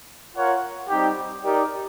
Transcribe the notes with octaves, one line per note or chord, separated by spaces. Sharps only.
F4 A#4 C#5 F#5
G3 C4 D#4 G4
D#4 G4 A#4 D5